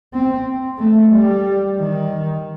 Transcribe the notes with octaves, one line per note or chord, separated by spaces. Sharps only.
C4
A3
G3
D#3